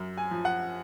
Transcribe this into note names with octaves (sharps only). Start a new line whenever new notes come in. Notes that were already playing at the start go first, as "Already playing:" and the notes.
Already playing: F#2
G#5
F3
F#5